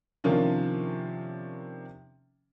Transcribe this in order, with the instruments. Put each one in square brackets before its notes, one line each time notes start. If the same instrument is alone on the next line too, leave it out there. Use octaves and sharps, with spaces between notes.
[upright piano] C3 D#3 F3 A#3 C#4 D4